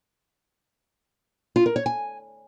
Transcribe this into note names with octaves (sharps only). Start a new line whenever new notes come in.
F4
A#4
C#5
G#5